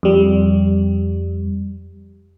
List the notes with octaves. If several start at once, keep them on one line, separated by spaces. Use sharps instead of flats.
F2 G3